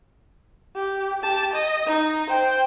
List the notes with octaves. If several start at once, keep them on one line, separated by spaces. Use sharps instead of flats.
G4
G4 A5
D#5
D#4
C5 G5